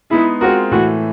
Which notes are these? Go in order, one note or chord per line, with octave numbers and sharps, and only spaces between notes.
G#3 B3 D#4 E4 G#4
G#3 C4 F4 F#4 A#4
A2 E3 A3 F#4